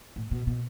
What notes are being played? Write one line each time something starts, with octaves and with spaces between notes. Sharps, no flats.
A2
B2
B2